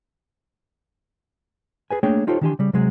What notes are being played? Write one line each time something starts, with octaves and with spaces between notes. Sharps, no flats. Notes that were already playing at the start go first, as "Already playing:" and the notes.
G#4 B4 G#5
A3 A#3 D4 G#4 C#5 G5
D#4 F4 G4 A4 C5 C#5
D#3 E3 D4 G4 G#5 C6
C#3 G3
C3 F#3 G#3 G#4